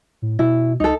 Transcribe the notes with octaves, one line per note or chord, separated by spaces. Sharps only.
A2
B2 E4
C#2 D#4 A4